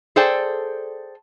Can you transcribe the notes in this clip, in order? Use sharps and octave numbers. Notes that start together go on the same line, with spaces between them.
G#4 A4 C5 D5 G5 A5